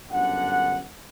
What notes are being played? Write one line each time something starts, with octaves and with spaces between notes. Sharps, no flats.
G1 F#2 D3 F#5